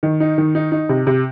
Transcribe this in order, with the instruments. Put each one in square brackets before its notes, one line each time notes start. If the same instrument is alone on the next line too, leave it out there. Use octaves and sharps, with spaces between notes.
[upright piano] D#3
D#4
D#3
D#4
D#4
C3
C3